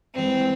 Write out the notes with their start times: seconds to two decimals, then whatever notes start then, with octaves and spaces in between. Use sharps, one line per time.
0.14 G2 E3 G#3 C4